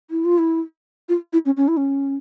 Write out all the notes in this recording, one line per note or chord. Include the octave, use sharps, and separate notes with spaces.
E4
F4
E4
F4
E4
C#4
C#4
E4
C#4